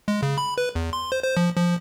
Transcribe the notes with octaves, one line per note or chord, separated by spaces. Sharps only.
G#3
C#3
B5
B4
E2
C6
C5
C5
F3
F3